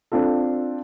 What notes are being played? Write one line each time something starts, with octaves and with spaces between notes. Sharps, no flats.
C4 D4 F4 A4